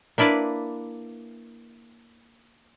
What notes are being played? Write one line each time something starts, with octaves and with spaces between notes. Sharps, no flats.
A#3 D4 E4 B4 D5